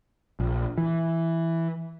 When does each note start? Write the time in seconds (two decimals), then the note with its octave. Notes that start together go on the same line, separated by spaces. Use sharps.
0.40 A#1
0.78 E3